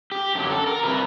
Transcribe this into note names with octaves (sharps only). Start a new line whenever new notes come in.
G4
F#2 D3 F#3 G4
A4
A#4
C3 G3 B4